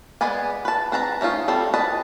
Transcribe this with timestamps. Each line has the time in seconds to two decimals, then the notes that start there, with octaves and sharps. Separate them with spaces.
0.21 G#3 B3 B4 D5 G#5
0.65 B4 A5
0.92 C4 B4 A5 A#5
1.21 A3 C#4 D#4 F4
1.48 G3 C4 A4
1.74 B4 D#5 A5